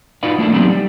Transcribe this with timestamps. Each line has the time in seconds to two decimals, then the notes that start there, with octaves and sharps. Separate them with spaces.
0.23 D#4 F4 F#4 B4 D5 F5
0.38 A3 A#3 D4 E4 F#4 A4
0.53 F#3 B3 C4 D4 D#4 G4
0.70 G3